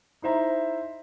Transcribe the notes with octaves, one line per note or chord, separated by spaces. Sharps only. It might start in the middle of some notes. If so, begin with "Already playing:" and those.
D#4 E4 C5 E5 A#5